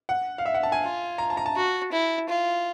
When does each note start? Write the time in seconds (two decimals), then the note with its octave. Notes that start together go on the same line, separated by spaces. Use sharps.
0.09 F#5
0.38 F5
0.46 E5
0.54 F#5
0.63 A5
0.72 G#5
0.82 F4
1.18 A#5
1.30 A5
1.37 A#5
1.46 A5
1.56 F#4
1.92 E4
2.29 F4